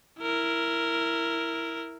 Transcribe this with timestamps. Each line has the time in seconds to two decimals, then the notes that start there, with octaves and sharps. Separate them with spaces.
0.21 E4 A#4